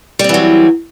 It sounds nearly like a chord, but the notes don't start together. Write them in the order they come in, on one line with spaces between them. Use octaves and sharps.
G3 C4 E3 F#3